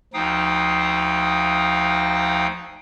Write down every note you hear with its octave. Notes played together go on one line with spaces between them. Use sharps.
D2 F3 D#4 F5 G5 D#6